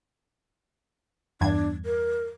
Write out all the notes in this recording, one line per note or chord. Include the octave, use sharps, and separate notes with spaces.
E2 G2 D4 G#6
A#4